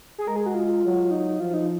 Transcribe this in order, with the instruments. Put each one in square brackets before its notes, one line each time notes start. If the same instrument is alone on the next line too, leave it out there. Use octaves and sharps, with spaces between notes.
[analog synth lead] G#4
[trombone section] G#3 [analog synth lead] A#4
[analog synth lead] G#4
F#4
F4
[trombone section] F#3
[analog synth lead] D#4
[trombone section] F3 [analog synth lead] F4
[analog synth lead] D#4